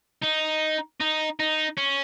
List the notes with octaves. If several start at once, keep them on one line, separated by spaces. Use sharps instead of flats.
D#4
D#4
D#4
C#4